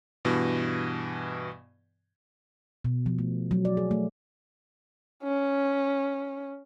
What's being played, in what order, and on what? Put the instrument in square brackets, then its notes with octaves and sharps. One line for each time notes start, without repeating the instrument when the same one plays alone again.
[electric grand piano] G2 B2 E3
[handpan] B2
F3
A3
F#3
D5
G#4
A3
[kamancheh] C#4